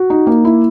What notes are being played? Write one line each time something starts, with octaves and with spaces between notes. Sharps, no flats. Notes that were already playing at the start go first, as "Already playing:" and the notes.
Already playing: F#4
D#4
A#3
E4